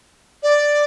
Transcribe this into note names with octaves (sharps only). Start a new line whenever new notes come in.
D5